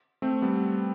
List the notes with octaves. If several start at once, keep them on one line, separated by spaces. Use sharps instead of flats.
A3 C4
G3 B3